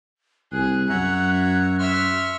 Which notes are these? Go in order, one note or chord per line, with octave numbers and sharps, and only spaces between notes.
C2 G#4 F#6
F#2 C#5 E5 F#5 A#5
E5 C6 C#6 F6